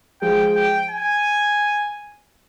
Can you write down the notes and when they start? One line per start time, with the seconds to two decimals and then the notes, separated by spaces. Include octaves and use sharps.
0.22 F3 G#3 G5
0.56 G5
0.90 G#5